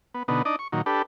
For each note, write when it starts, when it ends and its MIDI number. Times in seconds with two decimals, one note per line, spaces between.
0.14 0.23 59
0.28 0.42 47
0.28 0.42 50
0.28 0.42 59
0.28 0.42 63
0.45 0.56 62
0.45 0.56 63
0.45 0.56 74
0.45 0.56 75
0.59 0.68 85
0.72 0.82 46
0.72 0.82 51
0.72 0.82 54
0.86 1.02 62
0.86 1.02 67
0.86 1.02 69
0.86 1.02 71